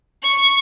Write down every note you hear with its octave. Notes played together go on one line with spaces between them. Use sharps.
C#6